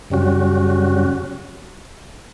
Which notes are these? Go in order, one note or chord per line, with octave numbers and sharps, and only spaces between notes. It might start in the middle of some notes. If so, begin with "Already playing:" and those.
F#2 C#3 G3 C#4 F#4